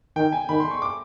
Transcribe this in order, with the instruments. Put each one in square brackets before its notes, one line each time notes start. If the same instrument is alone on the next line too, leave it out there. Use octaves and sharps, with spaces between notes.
[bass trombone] D#3 [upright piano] G5
[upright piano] G#5
[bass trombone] D#3 [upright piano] B5
[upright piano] C6
C#6
D6